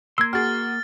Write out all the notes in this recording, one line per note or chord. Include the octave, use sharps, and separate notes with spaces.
A#3 C6 E6 G#6
F#4 G#4 F6 A6